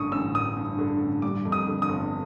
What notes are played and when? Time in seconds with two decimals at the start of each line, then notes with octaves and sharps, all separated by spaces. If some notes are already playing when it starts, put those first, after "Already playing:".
Already playing: A1 G2 D3 C#6 D#6
0.12 A1 E6
0.34 A1 D#6
0.56 G2
0.79 D3
1.01 A1
1.22 G3 D6
1.45 F2
1.52 D#6
1.67 D3
1.82 D#6
1.89 G1